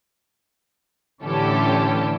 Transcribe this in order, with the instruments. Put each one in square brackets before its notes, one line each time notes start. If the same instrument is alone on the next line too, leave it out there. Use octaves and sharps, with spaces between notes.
[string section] A2 D3 E3 C#4 G4 A4